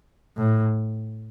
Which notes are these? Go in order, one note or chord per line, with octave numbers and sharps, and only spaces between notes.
A2